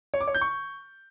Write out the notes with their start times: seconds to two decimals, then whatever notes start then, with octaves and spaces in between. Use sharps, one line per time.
0.14 C#5
0.21 D6
0.27 C#5
0.34 G6
0.41 C#6